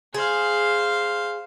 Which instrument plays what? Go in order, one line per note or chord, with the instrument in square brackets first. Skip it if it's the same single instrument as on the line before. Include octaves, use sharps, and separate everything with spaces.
[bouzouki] G#4 [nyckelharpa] C5 F5